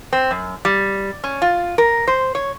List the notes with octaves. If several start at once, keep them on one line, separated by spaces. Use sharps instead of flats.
C4
F#2
G3
C#4
F4
A#4
C5
C#5